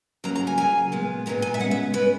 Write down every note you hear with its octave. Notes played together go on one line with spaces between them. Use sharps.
C#3 F#3 A#3 A#5
A#5
G#5
C#3 F#3 A#3 G#5
A#2 G#3 B3
A#2 G#3 B3 A#5
G#5
E5
C#3 G#3 B3 F#5
E5
C#3 G#3 B3 B4